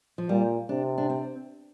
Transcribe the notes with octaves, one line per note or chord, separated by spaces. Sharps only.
F3
A#2 G3
C3 D4
D4
C4